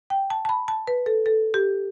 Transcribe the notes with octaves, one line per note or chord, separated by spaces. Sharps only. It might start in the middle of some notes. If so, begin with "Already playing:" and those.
G5
A5
A5
B5
A5
B4
A4
A4
G4